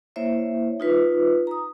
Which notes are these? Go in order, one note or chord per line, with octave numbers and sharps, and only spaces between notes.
A#3 E4 C5 C#5 E5
D#4 F4 B4
A#5 D#6